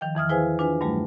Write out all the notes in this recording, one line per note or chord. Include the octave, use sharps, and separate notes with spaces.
D#3 F3 G5
E2 E3 D#6 F6
E4 G#4 B4 C5 F5 G#5
D4 F4 B4 G#5
G2 F#3 G3 A3